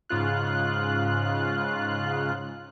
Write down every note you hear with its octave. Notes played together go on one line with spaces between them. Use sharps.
G#2 C#3 F4 F#6